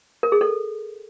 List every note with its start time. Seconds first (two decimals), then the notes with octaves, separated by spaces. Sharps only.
0.23 A#4
0.32 G#4
0.41 A4